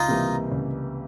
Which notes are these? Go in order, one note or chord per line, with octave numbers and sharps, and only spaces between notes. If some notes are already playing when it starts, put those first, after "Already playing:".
Already playing: C#2 D#4 F4
C3 E3 G3 A#3
C#2